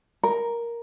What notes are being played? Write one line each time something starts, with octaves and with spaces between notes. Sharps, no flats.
A#4